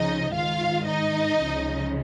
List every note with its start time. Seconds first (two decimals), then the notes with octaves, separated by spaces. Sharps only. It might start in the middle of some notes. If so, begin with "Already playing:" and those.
Already playing: C#2 C#3 F3 D#4 D#5
0.34 G#2 D#3 F4 F5
0.87 D#4 D#5
1.39 C#2 C#3 F3